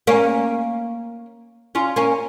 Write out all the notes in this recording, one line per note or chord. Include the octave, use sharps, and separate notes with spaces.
A#3 C#4
C#4 F4
A#3 C#4